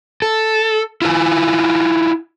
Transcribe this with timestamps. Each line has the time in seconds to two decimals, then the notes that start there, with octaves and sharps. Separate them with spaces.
0.22 A4
1.02 E4 F4 B4 G#5